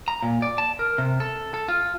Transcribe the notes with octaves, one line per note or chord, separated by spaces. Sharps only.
A#5
A#2
D5
A5
A#4
C3
A4
A4
F4